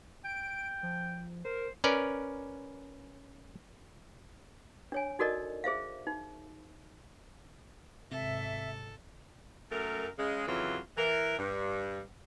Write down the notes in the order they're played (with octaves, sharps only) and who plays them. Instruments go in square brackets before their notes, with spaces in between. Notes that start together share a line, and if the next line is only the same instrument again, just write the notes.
[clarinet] G5 [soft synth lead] D7
[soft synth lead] F3
[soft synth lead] A#4 [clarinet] C5
[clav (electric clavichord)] C#4 A#4 B4 D5
[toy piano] D4 C#5 G#5
D#4 F#4 A4 A#4 D5 D#5
G#4 C5 E5 F5
D#4
[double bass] G#1 G#2 [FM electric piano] C3 [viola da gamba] A4 [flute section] E5
[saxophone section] F#2 A3 A#4
C#3 G#3
F2 C#3 E3 F#3 F4
E3 A#4
G2